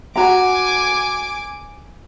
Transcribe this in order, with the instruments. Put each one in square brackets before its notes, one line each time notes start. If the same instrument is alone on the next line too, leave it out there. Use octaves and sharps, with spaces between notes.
[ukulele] F#4 A#5 [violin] G#5 D6